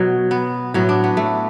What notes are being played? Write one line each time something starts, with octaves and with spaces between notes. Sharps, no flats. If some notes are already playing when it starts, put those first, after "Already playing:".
Already playing: B2 F#3
B3
A2 F#3 B3
D4
B3
A3